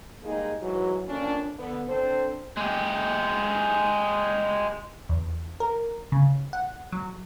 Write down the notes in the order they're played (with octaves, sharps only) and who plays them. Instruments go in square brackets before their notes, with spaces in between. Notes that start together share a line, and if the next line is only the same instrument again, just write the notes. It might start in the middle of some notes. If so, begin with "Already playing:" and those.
[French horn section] G3 G#3 A#3 D#4 G#4
G#2 E3 F#3
F2 A#3 C#4 D4
D3 B3
C4 D4 A4 C5
[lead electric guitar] G#3 G4
[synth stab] E2
A#4
C#3
F#5
F#3